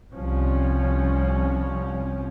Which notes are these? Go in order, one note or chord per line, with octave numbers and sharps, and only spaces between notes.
C2 F3 C#4